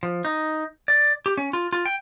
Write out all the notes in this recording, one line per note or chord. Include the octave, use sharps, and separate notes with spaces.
F3
D#4
D5
G4
C#4
F4
F4
G5